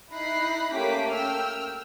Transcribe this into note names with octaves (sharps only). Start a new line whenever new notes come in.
D#4 E4 B5 F#6 A#6 C7
A3 A#3 C#4 G4 D6 B6
G5 E6 F6